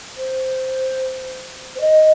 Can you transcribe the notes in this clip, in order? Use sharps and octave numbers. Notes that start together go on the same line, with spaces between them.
C5
C5
D#5